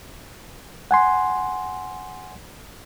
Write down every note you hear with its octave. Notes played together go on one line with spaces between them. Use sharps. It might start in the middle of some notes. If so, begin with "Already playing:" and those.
F#5 G#5 C6